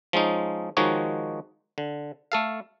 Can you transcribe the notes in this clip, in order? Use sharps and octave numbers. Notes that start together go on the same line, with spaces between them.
F3 G#3 C#4 D#4
D#3 F3 G#3 D#4 F#4 C#5
D3
A3 A4 F5